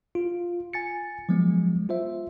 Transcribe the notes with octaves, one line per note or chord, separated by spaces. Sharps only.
F4
G#5 A6 C#7
F3 F#3 G#3 B3
F4 C5 E5